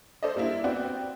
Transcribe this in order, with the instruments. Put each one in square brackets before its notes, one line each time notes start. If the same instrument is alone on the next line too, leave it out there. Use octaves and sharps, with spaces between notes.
[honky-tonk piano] A4 C5 D5 D#5
G3 A#3 D4 E4
B3 C4 F#4 D5 G5